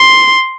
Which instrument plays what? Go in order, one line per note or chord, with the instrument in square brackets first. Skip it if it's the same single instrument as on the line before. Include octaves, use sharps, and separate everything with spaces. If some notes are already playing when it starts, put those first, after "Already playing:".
Already playing: [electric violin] C6